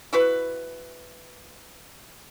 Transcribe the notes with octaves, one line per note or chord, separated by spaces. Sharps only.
E4 F#4 B4